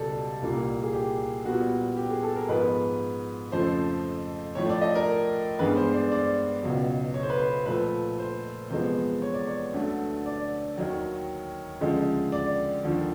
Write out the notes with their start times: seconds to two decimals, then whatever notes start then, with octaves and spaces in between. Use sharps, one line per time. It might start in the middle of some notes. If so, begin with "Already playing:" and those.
Already playing: C#2 B2 G3 A4 D5
0.42 C2 A#2 G3 A#3
0.83 G#4
0.93 G4
1.45 A#2 G3 B3 F#4
1.97 G4
2.11 G#4
2.23 A4
2.36 A#4
2.49 G#2 F3 G#3 B3 B4
3.52 F2 C#3 F3 A3 C5
4.55 A2 F3 A3 C#5
4.69 D5
4.81 D#5
4.95 A#4
5.59 G2 E3 G#3 B3 B4
5.77 C5
5.94 D5
6.12 D5
6.63 C#2 B2 F#3
7.14 C#5
7.23 C5
7.30 B4
7.38 C5
7.66 A#2 F3 A3 B4
8.19 C5
8.70 E2 C3 F3 G#3 B3 C5
9.22 C#5
9.34 D5
9.47 C#5
9.73 D2 D3 F#3 A3
10.26 D5
10.78 D#2 D#3 F#3
11.80 D2 C#3 F3 G#3
12.32 D5
12.83 D#2 D3 F3